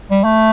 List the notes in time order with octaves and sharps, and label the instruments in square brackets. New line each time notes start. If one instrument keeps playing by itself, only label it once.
[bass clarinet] G3
A3